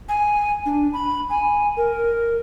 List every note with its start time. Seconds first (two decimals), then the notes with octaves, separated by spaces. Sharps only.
0.09 G#5
0.66 D4
0.93 B5
1.30 G#5
1.77 A#4